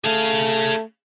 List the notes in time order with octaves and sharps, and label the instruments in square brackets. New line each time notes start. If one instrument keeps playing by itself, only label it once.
[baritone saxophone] A3 [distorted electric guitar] G#4 F5